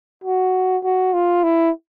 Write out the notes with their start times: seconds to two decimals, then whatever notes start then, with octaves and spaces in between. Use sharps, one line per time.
0.24 F#4
0.84 F#4
1.14 F4
1.44 E4